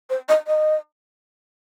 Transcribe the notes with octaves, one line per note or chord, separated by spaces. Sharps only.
C5
D#5
D#5